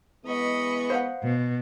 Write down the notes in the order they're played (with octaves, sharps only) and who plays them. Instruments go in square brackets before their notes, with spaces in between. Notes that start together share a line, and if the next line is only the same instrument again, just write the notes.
[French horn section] E3 G#3 B3 [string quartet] D#5 B5 C#6
[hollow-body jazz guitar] C5 F5 F#5
[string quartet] B2